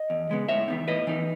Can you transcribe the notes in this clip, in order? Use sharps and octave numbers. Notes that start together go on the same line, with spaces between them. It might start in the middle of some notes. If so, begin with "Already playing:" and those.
Already playing: D#5
E2
C#3 G#3 B3
A2 C#5 E5
E3 B3 D#4
A2 B4 D#5
E3 B3 D#4